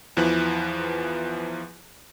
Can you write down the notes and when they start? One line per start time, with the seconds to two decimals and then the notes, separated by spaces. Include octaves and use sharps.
0.17 E2 E3 F3 B4 F#6